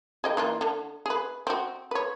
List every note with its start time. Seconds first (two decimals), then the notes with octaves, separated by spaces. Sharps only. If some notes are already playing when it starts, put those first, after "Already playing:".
0.24 G#4 D#5 G5
0.37 E3 A#3 F4
0.61 D3
1.06 G#4 B4
1.47 C4 F#4
1.91 B4 C#5